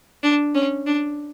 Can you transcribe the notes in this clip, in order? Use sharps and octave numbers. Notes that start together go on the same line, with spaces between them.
D4
C#4
D4